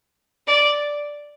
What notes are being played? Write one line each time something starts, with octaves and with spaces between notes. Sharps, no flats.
D5